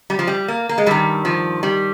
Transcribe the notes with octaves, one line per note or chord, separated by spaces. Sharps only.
G3
F3
G3
A#3
A#3
G#3
G2 D#3 G3
F3
G3